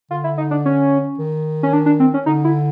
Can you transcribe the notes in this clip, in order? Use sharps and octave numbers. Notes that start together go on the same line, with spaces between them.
D3 F4
E4
D#4
D4
C#4
D#3
C#4
D4
D4
C4
C#4
D3 D#4
E4